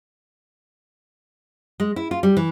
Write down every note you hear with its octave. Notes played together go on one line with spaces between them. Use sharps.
G#3
E4
F4
G3
E3